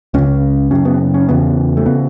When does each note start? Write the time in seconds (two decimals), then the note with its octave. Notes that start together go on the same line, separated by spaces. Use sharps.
0.14 C#2 C#3 C#4
0.71 F#2 C#3 C#4
0.85 B3
1.14 C#4
1.29 E2 C#3 B3
1.77 A3
1.86 C#3 B3